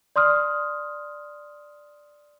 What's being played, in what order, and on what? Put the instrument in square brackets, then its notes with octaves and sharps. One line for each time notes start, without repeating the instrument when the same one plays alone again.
[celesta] D5 C6 D#6 F6